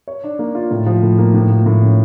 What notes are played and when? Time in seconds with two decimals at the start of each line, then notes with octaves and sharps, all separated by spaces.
0.08 C#5
0.24 D4
0.39 A#3
0.55 F4
0.71 A2
0.86 F3
1.03 A2
1.19 A#3
1.34 A2
1.50 F3
1.66 A2
1.82 C#4